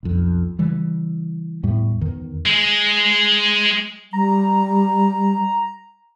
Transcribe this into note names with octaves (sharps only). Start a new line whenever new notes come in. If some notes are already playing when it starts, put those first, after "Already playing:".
B1 F2
C#3 E3 G3
E2 A2 G3
E2 D#3
G#3
G3 A#5